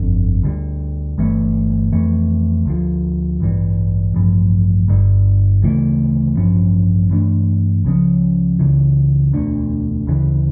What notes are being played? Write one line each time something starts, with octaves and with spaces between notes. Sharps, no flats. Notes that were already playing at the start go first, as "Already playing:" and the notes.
Already playing: G1 F2 D3
D2 D3 G3
G1 G2 E3 A3
F2 E3 A3
D2 D3 F3
A1 G2 E3 G3
A1 G2 F3
G1 G2 D3 G3
D2 C#3 E3 A3
A1 G2 F3 C#4
G2 E3 A3 D4
C#2 C#3 F3 C#4
C#2 C#3 E3
E1 D2 D3
D2 C#3 E3